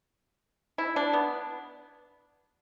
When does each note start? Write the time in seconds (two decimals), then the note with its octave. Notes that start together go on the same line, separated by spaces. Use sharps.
0.78 E4
0.96 D4
1.13 B3